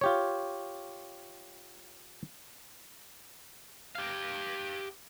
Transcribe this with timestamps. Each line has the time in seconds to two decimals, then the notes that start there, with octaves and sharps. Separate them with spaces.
0.01 F4 G4 C#5
3.95 G4 F5